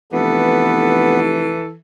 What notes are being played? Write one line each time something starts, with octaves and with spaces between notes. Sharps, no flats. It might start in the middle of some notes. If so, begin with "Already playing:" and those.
F1 E3 B3 A4